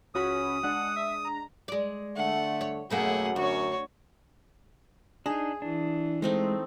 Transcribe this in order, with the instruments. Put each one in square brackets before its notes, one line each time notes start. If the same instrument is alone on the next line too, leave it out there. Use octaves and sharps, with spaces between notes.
[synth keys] C#2 F#4 B5 [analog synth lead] C#4 [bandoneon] D#6
[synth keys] G#3 D4 [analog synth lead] F#5
[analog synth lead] E5
A#5
[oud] G#3 D5
[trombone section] D3 A3 [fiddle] F#5
[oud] C#5
[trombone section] F#2 [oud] B2 A3 A#3 [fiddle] G#4 F#5
[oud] D2 [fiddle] F#4 C#5
[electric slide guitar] D4 D#4 [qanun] G#4
[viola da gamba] E3 [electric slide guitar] D4
[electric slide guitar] G#3 [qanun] A3 C4 D#4